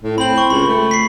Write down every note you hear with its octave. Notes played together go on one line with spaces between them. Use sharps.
A2
C4 B5 F#7
C#6
C#2 B5
A3
B6 C7